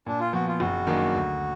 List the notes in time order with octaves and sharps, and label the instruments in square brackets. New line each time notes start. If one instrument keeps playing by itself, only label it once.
[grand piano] A#2 [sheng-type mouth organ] D4
[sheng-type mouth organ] F4
[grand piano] F3 B3 [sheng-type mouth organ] F#4
[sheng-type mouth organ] F4
[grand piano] F#1 [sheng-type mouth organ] F#4
[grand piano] F#2 D#3 A#3 D4
D2